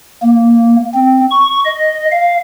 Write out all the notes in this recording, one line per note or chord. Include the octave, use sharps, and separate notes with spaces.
A#3
C4
C#6
D#5
F5